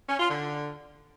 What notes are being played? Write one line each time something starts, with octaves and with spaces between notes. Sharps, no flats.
C#4
F4
D3